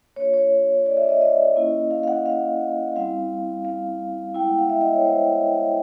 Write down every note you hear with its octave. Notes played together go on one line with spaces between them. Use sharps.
A#3 D4 F4 C#5
C#5
D5
E5
D5
D#5
D#5
A#3 C#4 E4
F5
F5
F#5
F5
G3 C4 E4 F5
F5
G#3 B3 E4 G5
F#5
F5
E5
D#5
C#5
C5